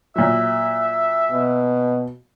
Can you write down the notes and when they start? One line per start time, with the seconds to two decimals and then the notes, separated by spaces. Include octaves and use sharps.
0.16 A#2 F#3 E5
1.31 B2